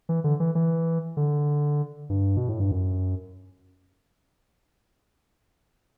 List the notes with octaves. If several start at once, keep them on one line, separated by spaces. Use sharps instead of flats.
E3
D3
E3
E3
D3
G2
B2
A2
G2
F#2